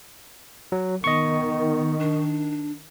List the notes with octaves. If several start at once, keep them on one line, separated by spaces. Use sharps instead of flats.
F#3
D#3 B3 D#5 C#6
D4